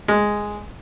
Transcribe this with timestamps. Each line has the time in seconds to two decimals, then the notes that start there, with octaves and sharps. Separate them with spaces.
0.08 G#3